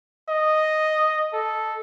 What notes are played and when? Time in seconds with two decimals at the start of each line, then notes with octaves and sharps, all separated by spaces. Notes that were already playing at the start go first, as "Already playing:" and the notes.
0.29 D#5
1.33 A4